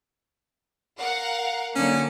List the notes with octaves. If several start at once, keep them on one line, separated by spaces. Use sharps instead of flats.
A#4 F5 F#5
D3 F#3 A#3 C#4